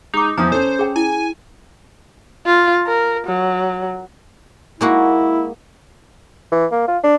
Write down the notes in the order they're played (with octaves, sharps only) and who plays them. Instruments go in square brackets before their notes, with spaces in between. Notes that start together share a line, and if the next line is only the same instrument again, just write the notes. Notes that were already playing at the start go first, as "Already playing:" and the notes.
[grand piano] G#3 [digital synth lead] D#4 [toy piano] D6 D#6
[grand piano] E2 E3 [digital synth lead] F3 [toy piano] A#5 D#6
[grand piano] C#4 A4 [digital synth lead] C5
[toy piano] G#4 G5
[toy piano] E4 [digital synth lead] G#5
[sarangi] F4
A#4
F#3
[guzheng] G#3 A#3 F#4 [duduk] E4
[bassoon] E3
A#3
F4
D4